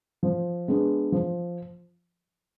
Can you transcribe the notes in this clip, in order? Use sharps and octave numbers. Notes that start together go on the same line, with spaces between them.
F3
G#3 B3 D4
F3